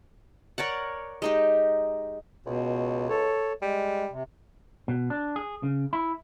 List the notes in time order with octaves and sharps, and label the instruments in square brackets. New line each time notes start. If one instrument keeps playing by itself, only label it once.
[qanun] A#4 C#5 D5 F#5
G#3 D#4 G4
[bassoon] C#2 [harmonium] B2
[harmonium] A4 C#5
[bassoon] G3 [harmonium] G#3
[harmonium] C3
[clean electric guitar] B2
D4
G#4
C#3
E4